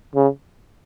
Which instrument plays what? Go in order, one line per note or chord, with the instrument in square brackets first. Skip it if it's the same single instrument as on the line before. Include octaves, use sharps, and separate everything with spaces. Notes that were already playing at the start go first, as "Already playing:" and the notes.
[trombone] C#3